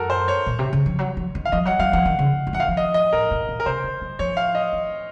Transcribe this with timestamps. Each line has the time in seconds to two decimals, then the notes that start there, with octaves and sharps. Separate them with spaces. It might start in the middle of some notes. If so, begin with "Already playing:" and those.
Already playing: F#2 F#4 A4 A#4
0.10 C5
0.28 C#5
0.46 A#2
0.59 C3
0.73 C#3
0.86 F3
0.99 F#3
1.17 F3
1.35 D#3
1.45 F5
1.52 F3 D#5
1.65 F#3 F#5
1.79 F#3 F5
1.93 F3 F#5
2.05 D#3
2.19 C#3
2.47 F#3
2.53 F3 F#5
2.60 D#3 F5
2.68 F3
2.77 D#5
2.94 D#5
3.13 A2 A#4
3.31 A#2
3.49 A#2
3.60 A#4
3.66 C3 C5
3.84 C#3
4.01 F#3
4.19 F3 C#5
4.37 F5
4.55 D#5
4.73 F3